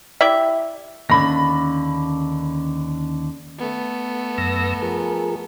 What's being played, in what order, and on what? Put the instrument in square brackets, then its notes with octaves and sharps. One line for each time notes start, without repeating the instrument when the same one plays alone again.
[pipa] E4 G4 D5 E5
[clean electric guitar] D#2 D3 [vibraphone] C#4 [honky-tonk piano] B5 A#6
[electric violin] A3 B3
[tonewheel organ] F#2 E6 A#6
F3 G#4 A#4